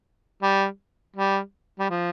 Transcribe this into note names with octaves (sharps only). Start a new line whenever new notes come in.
G3
G3
G3
F3